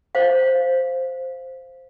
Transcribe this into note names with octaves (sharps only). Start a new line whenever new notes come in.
C5 F5